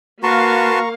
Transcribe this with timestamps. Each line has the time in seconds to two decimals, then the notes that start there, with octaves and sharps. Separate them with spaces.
0.23 A#3 F#4 B4 F5 A5 A#5 C6 C#6